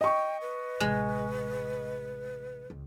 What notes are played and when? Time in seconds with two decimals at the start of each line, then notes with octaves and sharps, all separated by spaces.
0.01 D#5 G5 C#6
0.41 B4
0.80 A1 C3 G#3
2.70 C#2